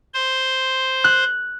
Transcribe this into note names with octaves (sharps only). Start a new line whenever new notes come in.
C5 C6
F#6